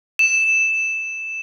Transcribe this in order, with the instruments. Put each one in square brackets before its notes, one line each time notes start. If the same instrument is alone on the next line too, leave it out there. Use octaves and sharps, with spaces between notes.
[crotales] E7